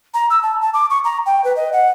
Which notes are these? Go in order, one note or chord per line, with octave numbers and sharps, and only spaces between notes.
A#5
E6
A5
A5
D6
C#6
A#5
G5
B4
D#5
F#5